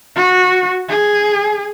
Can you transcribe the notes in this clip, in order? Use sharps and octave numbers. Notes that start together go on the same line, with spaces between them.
F#4
G#4